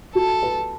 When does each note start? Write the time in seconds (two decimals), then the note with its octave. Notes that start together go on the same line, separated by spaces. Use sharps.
0.14 F#4 A4
0.43 B4